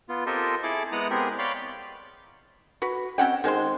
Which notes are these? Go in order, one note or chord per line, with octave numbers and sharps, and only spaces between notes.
B3 F4
C4 F4 G4 A4 A#4 D#5
E4 G#4 A4 D6
G#3 B3 E4 F#5 A#5 D#6
G#3 B3 C4 G4 G#4 A#4
C#5 D5 F5 G5 B5 C6
F#4 B4
C4 C#4 F#5 G5
D#3 G#3 C5 C6